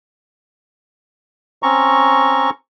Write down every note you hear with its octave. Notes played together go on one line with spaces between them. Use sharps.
C4 C#4 A#5 C#6